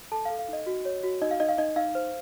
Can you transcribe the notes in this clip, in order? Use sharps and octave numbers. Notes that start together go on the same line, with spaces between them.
A4 A5
F5
A4
F5
D#4 D#5
F#4
C#5
F#4
D#4 D#5
F5
D#4 D#5
F5
D#4 D#5
D#4 F5
C5